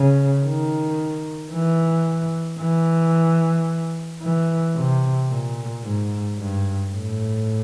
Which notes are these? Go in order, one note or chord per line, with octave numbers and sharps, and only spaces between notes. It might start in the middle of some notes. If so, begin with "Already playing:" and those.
Already playing: C#3
D#3
E3
E3
E3
C3
A#2
G#2
G2
A2